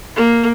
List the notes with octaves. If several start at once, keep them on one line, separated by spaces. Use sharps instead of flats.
A#3